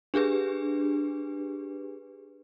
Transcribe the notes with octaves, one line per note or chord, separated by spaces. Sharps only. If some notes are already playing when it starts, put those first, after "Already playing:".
D4 G4 G#4 B4